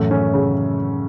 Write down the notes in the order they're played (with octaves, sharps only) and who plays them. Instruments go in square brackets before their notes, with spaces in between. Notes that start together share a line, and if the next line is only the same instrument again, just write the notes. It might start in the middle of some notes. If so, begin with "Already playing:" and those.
Already playing: [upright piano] F#2 A3 [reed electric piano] A2 E3 F#3
[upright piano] C#4
C#3